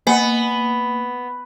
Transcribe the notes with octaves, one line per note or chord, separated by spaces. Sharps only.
A#3 B3 G#5